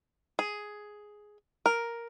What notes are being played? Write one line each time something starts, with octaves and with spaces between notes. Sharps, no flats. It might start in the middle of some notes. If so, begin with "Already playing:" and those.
G#4
A#4